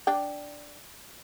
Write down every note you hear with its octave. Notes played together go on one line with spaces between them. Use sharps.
D4 D5 G5